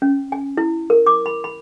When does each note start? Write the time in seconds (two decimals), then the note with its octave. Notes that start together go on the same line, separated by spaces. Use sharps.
0.02 C#4
0.32 G#5
0.57 E4
0.90 A#4
1.06 D6
1.26 B5
1.44 B5